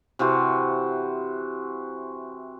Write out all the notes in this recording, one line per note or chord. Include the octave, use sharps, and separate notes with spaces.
C3 E3 F#4 C5